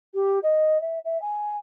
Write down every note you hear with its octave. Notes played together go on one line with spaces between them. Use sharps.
G4
D#5
E5
E5
G#5